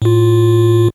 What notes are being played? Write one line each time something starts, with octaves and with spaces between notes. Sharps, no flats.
A2 F4